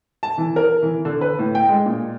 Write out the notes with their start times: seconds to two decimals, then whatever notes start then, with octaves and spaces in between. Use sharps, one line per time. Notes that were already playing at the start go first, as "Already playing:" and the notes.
0.23 A5
0.38 E3
0.56 A#4
0.82 E3
1.05 D3
1.21 B4
1.39 A2
1.55 G5
1.69 G#3
1.86 A#2